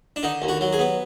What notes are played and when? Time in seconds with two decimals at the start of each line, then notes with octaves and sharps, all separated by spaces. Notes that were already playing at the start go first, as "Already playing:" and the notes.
0.16 D4
0.23 D3 D#4
0.42 D#2
0.48 F#4
0.61 F#3
0.73 G#4
0.79 B3